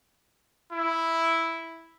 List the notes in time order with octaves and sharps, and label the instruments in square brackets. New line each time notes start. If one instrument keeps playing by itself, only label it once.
[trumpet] E4